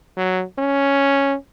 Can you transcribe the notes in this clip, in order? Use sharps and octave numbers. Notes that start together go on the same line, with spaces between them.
F#3
C#4